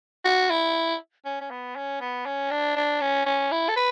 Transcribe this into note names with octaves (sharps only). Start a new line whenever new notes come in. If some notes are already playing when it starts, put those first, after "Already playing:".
F#4
E4
C#4
C#4
B3
C#4
B3
C#4
D4
D4
C#4
C#4
E4
A4
B4